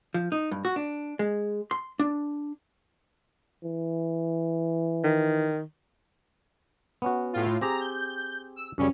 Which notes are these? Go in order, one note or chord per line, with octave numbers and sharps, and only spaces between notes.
F3
D#4
G2
F#4
D4
G#3
C6
D4
E3
D#3
B3 C#4 F#4
A2 F4
C4 G4 G#4 A#5
G6
E6
F#2 C#3 G3 C#4